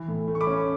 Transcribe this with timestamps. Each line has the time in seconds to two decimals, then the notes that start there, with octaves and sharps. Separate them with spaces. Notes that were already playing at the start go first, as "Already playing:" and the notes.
Already playing: E3
0.08 A2
0.28 A3
0.35 C#6
0.41 B5 D6
0.47 C#4